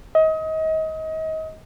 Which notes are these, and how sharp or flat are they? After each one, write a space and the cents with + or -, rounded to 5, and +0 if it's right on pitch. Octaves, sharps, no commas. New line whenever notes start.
D#5 +30